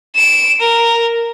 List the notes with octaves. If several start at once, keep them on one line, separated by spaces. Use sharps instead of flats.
D7 E7
A#4